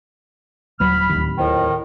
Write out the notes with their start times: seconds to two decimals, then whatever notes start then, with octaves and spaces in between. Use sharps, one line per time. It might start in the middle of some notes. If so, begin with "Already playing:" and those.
0.80 D#1 D#2 F#3 B5 F6
1.10 D1 D#2
1.38 F2 A2 D#3